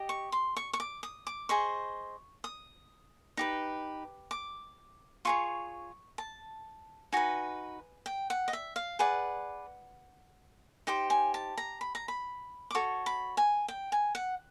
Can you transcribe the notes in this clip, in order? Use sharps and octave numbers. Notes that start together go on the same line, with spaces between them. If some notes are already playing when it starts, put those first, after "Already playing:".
Already playing: G4 D#5
C#6
C6
C#6
C#6
D6
D#6
D6
G#4 C5 D#5 C#6
D#6
D#4 G4 B4
D6
F4 G#4 C#5 C#6
A5
D#4 F#4 B4 G#5
G5
F#5
D#5
E5
F5
G#4 B4 D5 F#5
D#4 G4 C5 G5
G#5
A5
A#5
B5
A#5
B5
D6
F#4 A4 C#5 C#6
B5
G#5
G5
G#5
F#5